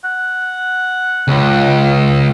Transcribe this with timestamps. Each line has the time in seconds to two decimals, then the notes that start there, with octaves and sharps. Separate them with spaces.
0.05 F#5
1.28 C#2